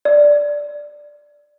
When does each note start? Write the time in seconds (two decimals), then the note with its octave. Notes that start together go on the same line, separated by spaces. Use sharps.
0.05 D5